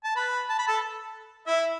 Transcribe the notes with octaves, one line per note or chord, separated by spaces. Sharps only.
A5
B4 B5
A5
B5
A4 A5
E4 E5